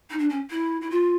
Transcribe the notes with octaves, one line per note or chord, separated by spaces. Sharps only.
D#4
D4
C#4
E4
E4
F4